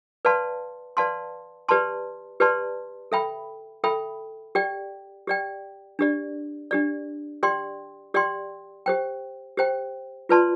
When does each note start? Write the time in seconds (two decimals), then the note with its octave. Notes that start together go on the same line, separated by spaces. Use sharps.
0.25 B4 D5 F5 A5 C6
0.97 B4 D5 F5 A5 C6
1.69 G4 B4 D5 A5 C6
2.40 G4 B4 D5 A5 C6
3.12 A4 E5 G5 B5
3.84 A4 E5 G5 B5
4.55 G4 D5 G5
5.27 G4 D5 G5
5.99 D4 G4 D5
6.71 D4 G4 D5
7.43 G4 D5 G5 C6
8.14 G4 D5 G5 C6
8.86 G4 C5 G5
9.57 G4 C5 G5
10.29 F4 B4 D5 A5 C6